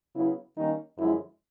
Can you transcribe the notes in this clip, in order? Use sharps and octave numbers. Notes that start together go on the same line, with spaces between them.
C#3 F#3 B3 E4
D#3 G3 A#3 C#4 D#4
F#2 D3 F3 G#3 E4